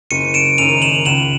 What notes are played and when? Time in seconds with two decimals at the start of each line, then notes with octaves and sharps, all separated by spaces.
0.11 F#1 C#7 D#7
0.34 D7 E7
0.58 F#2 D#3 D#7 F7
0.82 E7 F#7
1.05 C#2 E7 F#7